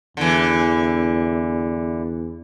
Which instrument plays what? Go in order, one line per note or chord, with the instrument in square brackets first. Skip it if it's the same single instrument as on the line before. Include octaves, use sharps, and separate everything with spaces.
[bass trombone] E2 [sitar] D3 E3